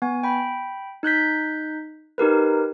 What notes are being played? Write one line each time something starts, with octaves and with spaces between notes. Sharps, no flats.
B3 G#5
G5 B5
D#4 F#6 G6 B6
D#4 G4 A#4 B4